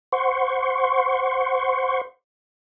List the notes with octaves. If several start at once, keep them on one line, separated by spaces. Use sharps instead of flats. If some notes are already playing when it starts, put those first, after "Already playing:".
C5 F#5 C6 C#6